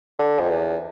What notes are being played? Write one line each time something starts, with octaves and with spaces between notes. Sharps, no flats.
D3
F2
E2